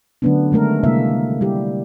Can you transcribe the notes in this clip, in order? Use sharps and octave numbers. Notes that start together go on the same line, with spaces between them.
D3 F#3 A3 B3 C#4 D4
D#3 G#3 A3 A#4
C3 G3 G#3 A#3 E4 E5
G3 E4 G4